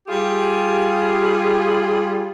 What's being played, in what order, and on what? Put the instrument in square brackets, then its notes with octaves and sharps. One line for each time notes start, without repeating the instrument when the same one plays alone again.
[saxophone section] G3 F4 G4 G#4